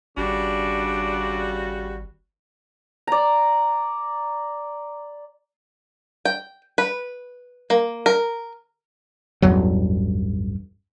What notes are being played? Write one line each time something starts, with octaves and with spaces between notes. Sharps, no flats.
G#1 C#3 G3 D4 F#4
D5 A#5
G5
B4
A#3
A#4
A1 E2 G2 F#3